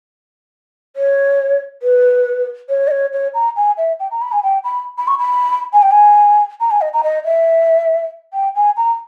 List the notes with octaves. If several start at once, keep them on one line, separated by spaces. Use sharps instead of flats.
C#5
B4
C#5
D#5
C#5
C#5
A#5
G#5
E5
G5
A#5
B5
G#5
G5
B5
B5
C#6
B5
G#5
G5
G#5
A#5
G#5
D#5
A#5
D#5
E5
G5
G#5
A#5